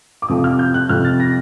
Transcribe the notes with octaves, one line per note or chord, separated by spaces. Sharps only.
D6
F2 C3 F3 D#6
F6
G6
F#6
F2 C3 F3 F6
A6
A#6